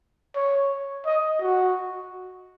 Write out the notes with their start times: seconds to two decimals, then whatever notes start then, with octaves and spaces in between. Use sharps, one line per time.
0.36 C#5
1.06 D#5
1.41 F#4